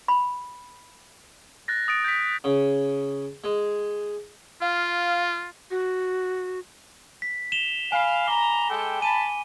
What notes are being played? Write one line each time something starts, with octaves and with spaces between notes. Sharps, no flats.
B5
F#6 A6 A#6
D#6 A6 D7
G6 B6
C#3
G#3
F4 F5
F#4
B6
E7 F7 G7
F5 G#5 B5
A#5 D6 G7
G#3 A4 G5
G#5 A5 B5 D#7